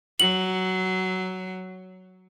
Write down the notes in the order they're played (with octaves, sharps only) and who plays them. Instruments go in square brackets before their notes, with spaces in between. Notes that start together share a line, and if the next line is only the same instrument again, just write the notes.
[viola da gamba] F#3 [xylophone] F#7